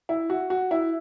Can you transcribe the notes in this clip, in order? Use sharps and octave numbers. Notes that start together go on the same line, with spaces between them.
E4
F#4
F#4
E4